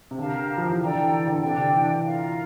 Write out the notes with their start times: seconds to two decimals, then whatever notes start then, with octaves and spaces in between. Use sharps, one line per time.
0.11 C3
0.17 D3 G4 A#4 F5 A5
0.57 F3
0.69 E3
0.80 D3 A4 D5 G5 A#5
0.95 E3
1.12 E3
1.27 D3
1.42 C3 D4 A4 D5 G5
1.58 D3
1.74 E3
2.04 F4 A#4 F5